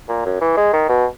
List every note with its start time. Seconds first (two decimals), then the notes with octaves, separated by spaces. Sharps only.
0.09 A#2
0.25 F#2
0.41 E3
0.57 G#3
0.73 D#3
0.89 B2